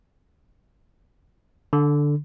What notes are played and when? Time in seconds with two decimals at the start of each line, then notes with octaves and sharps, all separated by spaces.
1.73 D3